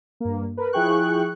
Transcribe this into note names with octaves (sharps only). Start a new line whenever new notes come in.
G2 A#3
A#4 B4
F3 E4 G#4 G5 C#6 F#6